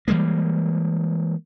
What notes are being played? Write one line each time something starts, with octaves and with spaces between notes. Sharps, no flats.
E3 G3 G#3 A#3